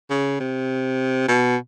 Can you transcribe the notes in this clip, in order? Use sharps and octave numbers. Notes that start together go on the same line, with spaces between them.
C#3
C3
B2